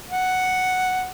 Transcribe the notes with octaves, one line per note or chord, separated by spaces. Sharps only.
F#5